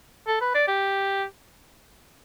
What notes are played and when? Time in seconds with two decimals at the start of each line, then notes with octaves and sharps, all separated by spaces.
0.27 A4
0.41 B4
0.55 D5
0.68 G4